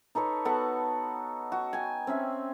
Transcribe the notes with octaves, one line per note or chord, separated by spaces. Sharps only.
D#4 A4 B4 C#5
B3 F#4 A4 F#5
F#4
G5 G#5
C4 C#4 E5